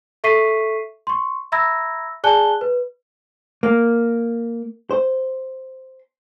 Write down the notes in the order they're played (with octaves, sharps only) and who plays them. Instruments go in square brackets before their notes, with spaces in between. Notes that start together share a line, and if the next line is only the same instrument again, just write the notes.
[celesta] A4 E5 C#6 B6 C7 D#7
C6 C#6
E5 A#5 B5 E6 G#6 A#6
G#4 D5 G#5 A5 F#6 G7
B4
[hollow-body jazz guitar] A#3
C5